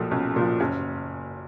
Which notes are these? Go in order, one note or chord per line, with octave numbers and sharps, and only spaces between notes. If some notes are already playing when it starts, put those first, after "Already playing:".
Already playing: B1 A#2 F3 A3
B1 C#4
A#2 F3
F#1 C#4